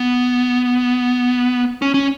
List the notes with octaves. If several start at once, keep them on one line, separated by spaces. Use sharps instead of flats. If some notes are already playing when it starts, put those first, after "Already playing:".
Already playing: B3
C#4
C#4